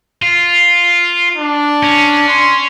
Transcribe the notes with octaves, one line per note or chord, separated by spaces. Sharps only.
F4
D4
C#4
C6